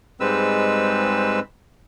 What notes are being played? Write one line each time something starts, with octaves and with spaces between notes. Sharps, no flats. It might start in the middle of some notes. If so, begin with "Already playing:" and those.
G#2 G3 G#3 C4 B4 E6